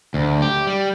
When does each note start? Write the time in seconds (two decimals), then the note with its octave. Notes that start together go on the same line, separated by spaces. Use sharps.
0.14 D2
0.42 G4
0.67 G3